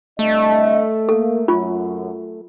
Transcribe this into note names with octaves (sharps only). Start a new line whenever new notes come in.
C2 D3 A3 D#5
A#3 A4
F#2 F4